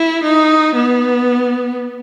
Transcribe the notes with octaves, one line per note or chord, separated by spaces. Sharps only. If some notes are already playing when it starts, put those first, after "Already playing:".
Already playing: E4
D#4
B3